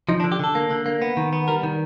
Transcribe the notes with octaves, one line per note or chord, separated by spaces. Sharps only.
F3 D#4
D4
D3
G4
D3 A4
A#3
D3
A#3
B3
D#3
B3
G3 A#4
D#3